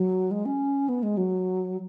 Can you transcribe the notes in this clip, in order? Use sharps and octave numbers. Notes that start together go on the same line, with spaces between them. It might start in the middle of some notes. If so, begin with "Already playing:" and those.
Already playing: F#3
G#3
C#4
B3
G#3
F#3